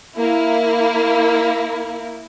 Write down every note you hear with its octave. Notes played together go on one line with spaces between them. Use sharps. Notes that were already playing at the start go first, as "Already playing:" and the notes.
A#3 E4